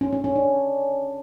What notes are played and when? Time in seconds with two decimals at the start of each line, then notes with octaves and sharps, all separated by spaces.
0.01 C#4
0.13 C#4
0.24 C#4
0.36 D4